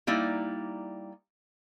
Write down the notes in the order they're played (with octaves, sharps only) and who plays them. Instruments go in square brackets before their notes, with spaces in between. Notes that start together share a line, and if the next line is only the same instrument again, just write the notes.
[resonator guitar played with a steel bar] G3 A#3 D#4 E4 D5